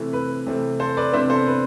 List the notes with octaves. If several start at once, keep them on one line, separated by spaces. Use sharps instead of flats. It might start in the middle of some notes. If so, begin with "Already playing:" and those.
Already playing: C3 E3 A3 C4 E4
B4
C3 E3 A3 C4
A4 C5
B4 D5
C3 E3 B3 D4 C5 E5
A4 C5
B4